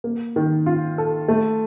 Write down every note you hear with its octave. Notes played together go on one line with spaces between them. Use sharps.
A#3
D#3
F4
A4
A3